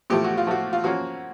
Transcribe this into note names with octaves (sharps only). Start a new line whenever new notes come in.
A2 F3 A3 G4
F#4
F4
A2 F3 A3 F#4
F4
F3 A#3 C#4 F#4